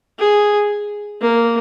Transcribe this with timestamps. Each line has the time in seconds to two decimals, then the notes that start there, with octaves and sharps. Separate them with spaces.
0.19 G#4
1.21 A#3